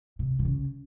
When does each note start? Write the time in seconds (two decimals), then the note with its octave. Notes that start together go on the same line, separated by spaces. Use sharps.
0.19 C3
0.39 C3
0.45 C#3